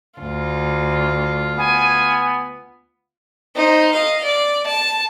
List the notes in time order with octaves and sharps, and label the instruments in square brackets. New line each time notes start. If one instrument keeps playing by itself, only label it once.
[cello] D2 [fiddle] F4
[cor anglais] B3 [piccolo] G#5
[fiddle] D#4 C5
D#5 F5
D5
A5